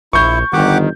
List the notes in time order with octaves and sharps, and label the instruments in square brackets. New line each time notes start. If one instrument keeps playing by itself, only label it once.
[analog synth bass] A#1 [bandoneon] E4 [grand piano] C#6 G6
[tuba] G1 [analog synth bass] D#3 [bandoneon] G4 F#5 D6